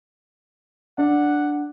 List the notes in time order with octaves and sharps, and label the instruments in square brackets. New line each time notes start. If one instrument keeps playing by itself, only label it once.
[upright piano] D4 [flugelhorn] F#5